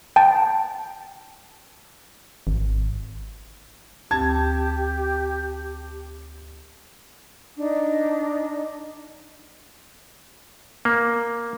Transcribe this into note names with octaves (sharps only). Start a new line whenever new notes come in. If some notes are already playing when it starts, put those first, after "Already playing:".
G5 A5
G#1
D2 C4 G4 A5 G#6
D4 D#4
A#3